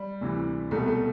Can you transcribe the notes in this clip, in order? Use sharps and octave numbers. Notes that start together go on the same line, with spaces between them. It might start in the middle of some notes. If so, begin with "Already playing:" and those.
Already playing: G3
D2 C3 E3
C2 B2 A3
A3